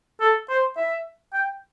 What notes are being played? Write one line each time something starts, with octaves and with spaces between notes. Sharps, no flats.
A4
C5
E5
G5